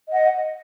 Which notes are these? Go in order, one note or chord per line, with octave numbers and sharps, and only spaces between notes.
D#5 F#5